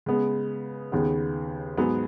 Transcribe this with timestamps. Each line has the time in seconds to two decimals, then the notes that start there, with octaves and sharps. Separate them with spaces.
0.06 C#3 G#3 B3
0.92 D#2 C#3 B3
1.77 G#2 F#3 B3 G#4